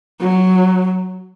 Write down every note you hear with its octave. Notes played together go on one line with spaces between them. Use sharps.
F#3